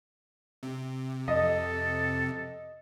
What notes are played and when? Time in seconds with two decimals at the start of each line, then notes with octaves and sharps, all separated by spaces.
0.63 C3
1.28 F2 F3 A4 D#5